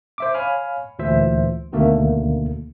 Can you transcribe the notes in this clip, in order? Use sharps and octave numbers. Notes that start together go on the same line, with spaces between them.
C5 E5 D6
C#5 F5 G#5 B5 F6
D2 A#2 E3 C5 E5
D2 B2 D3 D#3 A3 A#3